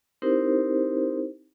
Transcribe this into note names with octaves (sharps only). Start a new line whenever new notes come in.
C4 D#4 E4 G4 A#4 C5